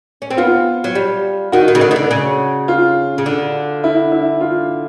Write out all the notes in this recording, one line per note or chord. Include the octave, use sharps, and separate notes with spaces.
C#4
C4
B3 F4
F#3
G3
D#3 F#4
D#3
C#3
D3
D#3
D3
C#3
F4
C#3
D3
E4
E4
F4